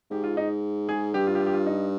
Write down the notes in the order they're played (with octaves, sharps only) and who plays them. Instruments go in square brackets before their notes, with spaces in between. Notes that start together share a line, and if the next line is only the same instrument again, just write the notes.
[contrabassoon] G#2 [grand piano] G4
[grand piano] F4
D#4
G#4
[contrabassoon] G2 [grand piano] G4
[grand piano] F4
G4
F4
G4
F4
D#4